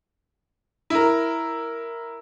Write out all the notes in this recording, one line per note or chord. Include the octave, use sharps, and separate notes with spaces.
E4 A#4